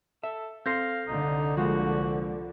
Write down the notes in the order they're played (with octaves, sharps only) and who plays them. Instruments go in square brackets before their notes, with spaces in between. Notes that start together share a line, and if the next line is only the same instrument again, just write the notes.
[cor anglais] A4 [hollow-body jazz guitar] E5
[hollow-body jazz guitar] C4 A4 C6 [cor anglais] F5 [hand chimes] G6 A#6 C7
[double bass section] C2 D3 [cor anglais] D#4
[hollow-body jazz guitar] F3 G#3 A#3 [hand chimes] F4 [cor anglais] F#4